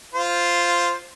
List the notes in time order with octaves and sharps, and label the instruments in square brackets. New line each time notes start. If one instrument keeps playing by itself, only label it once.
[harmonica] F4 C5